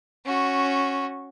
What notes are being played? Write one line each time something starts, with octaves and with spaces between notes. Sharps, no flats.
C#4 F#4